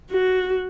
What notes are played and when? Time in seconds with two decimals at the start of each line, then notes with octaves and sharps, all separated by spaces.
0.12 F#4